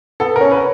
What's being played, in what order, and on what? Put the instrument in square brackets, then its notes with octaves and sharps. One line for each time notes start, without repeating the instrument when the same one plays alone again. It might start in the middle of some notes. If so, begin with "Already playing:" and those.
[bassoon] B3 [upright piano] A4
[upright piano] A#4
[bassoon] C#4
[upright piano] B4